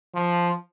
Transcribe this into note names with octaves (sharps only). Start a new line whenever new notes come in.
F3